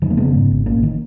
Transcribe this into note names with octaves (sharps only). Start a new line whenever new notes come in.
F1 D#3 F#3
A#3
C#3 G#3 B3
G#2
G#1
A#1 A#3 C#4
D#3